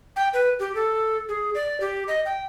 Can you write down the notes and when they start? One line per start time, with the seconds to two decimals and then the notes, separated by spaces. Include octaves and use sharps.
0.16 G5
0.34 B4
0.59 G4
0.75 A4
1.29 G#4
1.55 D5
1.80 G4
2.08 D#5
2.26 G5